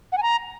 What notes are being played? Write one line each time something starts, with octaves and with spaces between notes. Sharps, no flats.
F#5
G#5
A#5